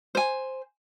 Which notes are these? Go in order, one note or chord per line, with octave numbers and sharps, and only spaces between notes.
C5 G#5